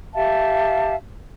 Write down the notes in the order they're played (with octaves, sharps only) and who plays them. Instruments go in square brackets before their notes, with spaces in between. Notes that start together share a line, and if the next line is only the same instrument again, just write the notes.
[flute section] G4 E5 F5 A5